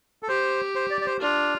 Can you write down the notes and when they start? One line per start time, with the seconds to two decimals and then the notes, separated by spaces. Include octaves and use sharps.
0.23 A4
0.29 G4 C5
0.75 C5
0.90 D5
1.01 D5
1.06 C5
1.21 D4 F4